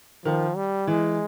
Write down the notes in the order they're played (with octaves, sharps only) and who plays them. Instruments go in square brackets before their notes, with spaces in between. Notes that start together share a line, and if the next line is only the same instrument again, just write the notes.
[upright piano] D#3 [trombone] F3
[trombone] G3
[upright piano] E3 [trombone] G#3